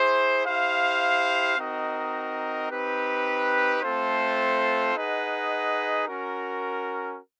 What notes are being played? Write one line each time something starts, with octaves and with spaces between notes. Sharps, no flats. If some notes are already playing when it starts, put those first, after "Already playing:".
Already playing: E4 G#4 C5
E4 G4 C5 F5
C4 D#4 F#4 A#4 D#5
C4 D#4 G4 B4
A3 C4 F4 A4 C5
D#4 G#4 B4 D#5 F#5
C#4 F#4 A#4